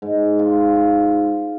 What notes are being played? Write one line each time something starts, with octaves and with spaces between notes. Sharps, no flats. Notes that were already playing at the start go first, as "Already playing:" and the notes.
G#2
F4
F4